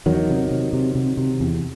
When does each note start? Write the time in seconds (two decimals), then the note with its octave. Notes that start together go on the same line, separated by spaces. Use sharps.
0.06 E2 D#3 F#3
0.29 C3
0.51 C3
0.73 C3
0.95 C3
1.17 C3
1.40 E2